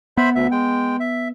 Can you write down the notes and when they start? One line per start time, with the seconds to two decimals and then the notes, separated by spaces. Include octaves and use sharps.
0.17 B3 C5 E5 B5
0.35 D2 E5
0.51 G#3 G5
1.00 E5